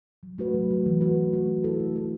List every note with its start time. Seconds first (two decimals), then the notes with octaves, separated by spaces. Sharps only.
0.23 F#3
0.38 A3 F#4 B4
0.54 F#3
0.71 A3 F#4 B4
0.86 E3
1.01 A3 F#4 B4
1.16 E3
1.33 A3 F#4 B4
1.48 A3
1.64 E4 A4
1.80 A3
1.96 E4 A4